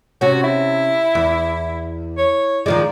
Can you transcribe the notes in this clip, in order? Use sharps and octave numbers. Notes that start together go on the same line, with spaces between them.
C3 C#4 F#4
E4
E2
C#5
D#3 F3 G#3 D5